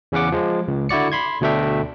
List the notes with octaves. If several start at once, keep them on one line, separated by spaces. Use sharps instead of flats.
E2 C#3 C#4 F#5 D6
F3 G#3
C#2
D3 E4 F#4 D5 C#7
B5 C6 G#6
D2 B2 A3 D4 E5 G5